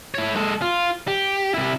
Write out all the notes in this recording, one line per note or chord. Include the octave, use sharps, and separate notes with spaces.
E4 C#5
G#3 A4
F4
G4
C3 E4